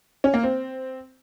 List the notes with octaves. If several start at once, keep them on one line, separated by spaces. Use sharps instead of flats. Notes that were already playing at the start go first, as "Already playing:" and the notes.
C#4
A#3
C4